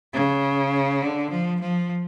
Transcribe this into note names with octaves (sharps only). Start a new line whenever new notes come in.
C#3
D3
F3
F3